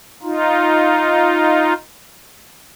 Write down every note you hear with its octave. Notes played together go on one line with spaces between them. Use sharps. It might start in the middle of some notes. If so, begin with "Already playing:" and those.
D#4 F4